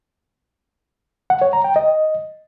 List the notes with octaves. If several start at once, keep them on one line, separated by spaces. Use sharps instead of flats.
F#5
C#5
A#5
G5
D#5